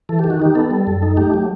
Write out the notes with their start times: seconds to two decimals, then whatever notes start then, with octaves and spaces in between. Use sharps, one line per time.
0.09 E3 A4
0.19 D#3 G4
0.30 F#4
0.40 D#4 G4
0.55 B3 A4
0.71 G3
0.87 F#2
1.03 D#4
1.17 A3 G4
1.34 F#3